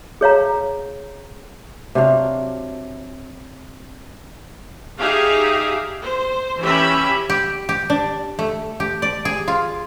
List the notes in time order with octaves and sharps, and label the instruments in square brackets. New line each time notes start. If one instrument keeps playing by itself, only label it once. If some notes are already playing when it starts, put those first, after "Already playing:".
[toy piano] G#4 C#5 F5 A#5
[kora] C3 F#3 D4 F5
[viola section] D#4 G4 G#4 E5 F5
C5
E3 C#4 G4 B4 E5 B5
[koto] G4
G4
D4
A3
G4
D5
G#4
F4